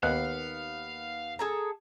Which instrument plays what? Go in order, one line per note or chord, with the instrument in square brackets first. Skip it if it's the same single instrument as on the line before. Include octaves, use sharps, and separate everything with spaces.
[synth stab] D#2 [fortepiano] B3 F#6 [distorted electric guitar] F5
[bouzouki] G#4 A4 A#5